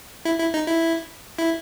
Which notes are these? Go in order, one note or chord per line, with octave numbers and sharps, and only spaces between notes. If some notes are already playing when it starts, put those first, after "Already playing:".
E4
E4
D#4
E4
E4